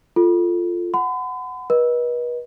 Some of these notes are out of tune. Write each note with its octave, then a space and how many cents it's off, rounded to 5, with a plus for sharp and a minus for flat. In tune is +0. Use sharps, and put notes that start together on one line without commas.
F4 -5 A4 +0
F#5 +0 B5 +45
B4 -35 D#5 +0